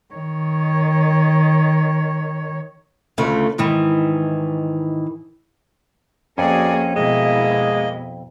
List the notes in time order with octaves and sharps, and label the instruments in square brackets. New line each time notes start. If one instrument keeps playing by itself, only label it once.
[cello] D#3 C#5
[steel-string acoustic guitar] D2 C#3 A3 F4
G#2 D#3 E3
[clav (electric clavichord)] F2 [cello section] A#3 F#4 G#4 [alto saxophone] C#4 [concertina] D5 G#5
[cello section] B2 E4 [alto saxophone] G#3 [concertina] A#3 D#5